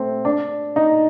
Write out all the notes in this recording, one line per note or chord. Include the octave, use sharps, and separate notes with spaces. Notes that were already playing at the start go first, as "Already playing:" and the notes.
Already playing: A3 C4
D4
D#4